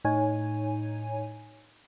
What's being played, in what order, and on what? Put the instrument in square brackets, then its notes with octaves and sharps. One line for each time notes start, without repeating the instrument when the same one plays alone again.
[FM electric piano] A2 D#4 C#5 G#5